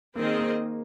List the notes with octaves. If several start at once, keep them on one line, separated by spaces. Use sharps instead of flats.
D#3 A#3 C4 G#4 D#5
A#3